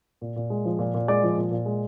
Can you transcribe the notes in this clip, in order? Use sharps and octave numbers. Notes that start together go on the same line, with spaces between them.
A#2
A#2
G#3
F3
A#2
A#2
G#3 D5
F3
A#2
A#2
G#3